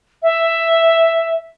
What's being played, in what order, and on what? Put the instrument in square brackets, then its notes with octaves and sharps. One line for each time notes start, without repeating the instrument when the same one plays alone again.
[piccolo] E5